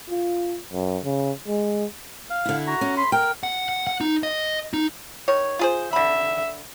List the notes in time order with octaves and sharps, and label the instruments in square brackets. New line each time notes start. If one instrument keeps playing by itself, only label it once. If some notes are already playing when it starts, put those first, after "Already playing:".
[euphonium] F4
F#2
C#3
G#3
[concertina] F5
[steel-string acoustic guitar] D3 E4
[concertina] F#4 A#5
[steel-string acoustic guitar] C#4
[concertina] B5 C6
[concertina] A#4 [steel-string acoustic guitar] G5
[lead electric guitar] F#5
F#5
F#5
D#4
D#5
D#4
[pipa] D#3 C#5
F4 G#4 C5
[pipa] D3 B5 [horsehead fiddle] E5